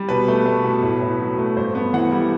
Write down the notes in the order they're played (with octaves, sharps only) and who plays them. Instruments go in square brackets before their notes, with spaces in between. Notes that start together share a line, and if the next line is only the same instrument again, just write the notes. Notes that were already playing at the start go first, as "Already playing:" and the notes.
Already playing: [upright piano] G3
B2 B4
A3
A3
B2
A2
A2
F#3
A3
G2 C5
B3
E3 F#5
G3